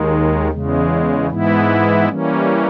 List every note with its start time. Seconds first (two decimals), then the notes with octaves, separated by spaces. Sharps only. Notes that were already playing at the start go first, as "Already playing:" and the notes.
Already playing: D#2 D#3 G#3
0.51 E2 C#3 G#3
1.30 G#2 E3 G#3 B3 E4
2.09 E3 G3 A#3 C#4